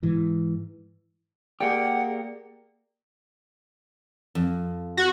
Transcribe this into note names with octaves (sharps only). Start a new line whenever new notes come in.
G#2 E3
A#3 G4 G#4 D5 F#5 G5
F2
F#4